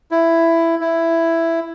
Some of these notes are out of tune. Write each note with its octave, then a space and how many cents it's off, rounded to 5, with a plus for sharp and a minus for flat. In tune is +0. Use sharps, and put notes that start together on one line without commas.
E4 +10
E4 +5